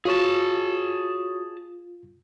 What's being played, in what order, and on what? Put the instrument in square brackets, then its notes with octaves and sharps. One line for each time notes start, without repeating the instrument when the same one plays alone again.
[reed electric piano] F4 [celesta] F#4 C#5 C#6 [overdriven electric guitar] G#4 A5